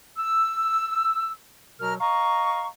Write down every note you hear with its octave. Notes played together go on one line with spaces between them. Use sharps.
E6
B2 F#3 A#4 F6
D#5 F5 A#5 C#6